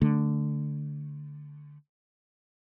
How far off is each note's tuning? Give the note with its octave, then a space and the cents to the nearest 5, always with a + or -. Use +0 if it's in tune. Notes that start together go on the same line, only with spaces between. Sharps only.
D3 +0 A3 +0